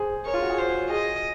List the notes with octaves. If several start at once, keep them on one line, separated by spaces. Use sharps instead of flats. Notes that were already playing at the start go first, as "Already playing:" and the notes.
Already playing: G#4 C5
A#4 C#5
F4
F#4
G#4
C5
G#4 D#5